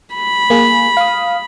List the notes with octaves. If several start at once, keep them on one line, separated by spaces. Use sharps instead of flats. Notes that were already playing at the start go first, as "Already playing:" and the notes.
B5
A#3 G#4
F5 D#6